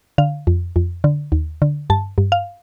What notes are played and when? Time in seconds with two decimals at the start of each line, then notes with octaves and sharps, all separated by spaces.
0.18 D3 F5
0.47 F2
0.76 F2
1.04 D3
1.32 D#2
1.62 D3
1.90 G2 A5
2.18 G2
2.32 F5